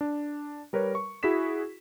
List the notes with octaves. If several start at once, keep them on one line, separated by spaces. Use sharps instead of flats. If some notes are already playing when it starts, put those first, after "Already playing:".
D4
G3 A#4 B4 C#5
C#6
E4 F#4 G#4 C#6 B6 E7